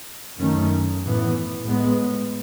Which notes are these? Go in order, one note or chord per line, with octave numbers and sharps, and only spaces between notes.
F#2 D#3 A3 C#4
A2 E3 B3
A2 G#3 B3